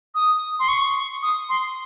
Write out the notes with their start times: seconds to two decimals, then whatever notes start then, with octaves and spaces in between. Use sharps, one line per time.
0.15 D#6
0.60 C6
0.69 C#6
1.22 D#6
1.49 C6